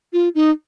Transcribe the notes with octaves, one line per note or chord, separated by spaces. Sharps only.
F4
D#4